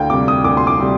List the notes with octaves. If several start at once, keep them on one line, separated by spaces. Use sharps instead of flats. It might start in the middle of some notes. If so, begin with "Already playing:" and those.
Already playing: D2 F5 G5
C3 G3 D6
D#6
D2 D6
C6
D6
C3 G3